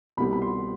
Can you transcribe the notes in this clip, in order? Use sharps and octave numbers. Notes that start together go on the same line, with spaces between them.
C2 B2 G3 C4 B5
B5
C6